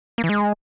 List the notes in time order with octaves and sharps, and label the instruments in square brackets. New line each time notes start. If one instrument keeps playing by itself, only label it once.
[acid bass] A#3
E3
G#3